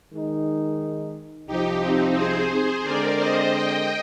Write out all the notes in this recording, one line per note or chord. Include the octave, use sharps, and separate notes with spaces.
D#3 G#3 D#4
C2 C3 F3 D#4 G4
C4 D#4
G#4 C5
G#4 C5
D3 G#3 C4 A#4 D5
C5 D#5
D#5 G5